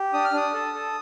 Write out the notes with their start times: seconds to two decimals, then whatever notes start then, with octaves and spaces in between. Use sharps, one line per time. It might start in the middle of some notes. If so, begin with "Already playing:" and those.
Already playing: G4
0.13 D4 D#6
0.25 F6
0.33 D4 D#6
0.53 A4
0.74 A4